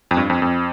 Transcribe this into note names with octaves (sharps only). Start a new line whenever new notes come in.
F2
G2
F2
F2